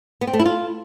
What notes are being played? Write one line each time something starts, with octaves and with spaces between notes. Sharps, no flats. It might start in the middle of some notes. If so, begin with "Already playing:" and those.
B3
C4
A3
E4
F4